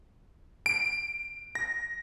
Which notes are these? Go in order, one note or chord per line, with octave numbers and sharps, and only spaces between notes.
D7
A#6